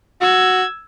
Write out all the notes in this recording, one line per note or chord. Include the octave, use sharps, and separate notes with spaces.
F#4 E6 G#6